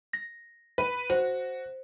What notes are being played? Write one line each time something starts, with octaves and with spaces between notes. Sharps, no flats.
A#6
B4
F#4 C5